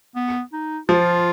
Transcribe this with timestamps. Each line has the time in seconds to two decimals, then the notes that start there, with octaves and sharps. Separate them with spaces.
0.16 B3
0.53 D#4
0.89 F3 F4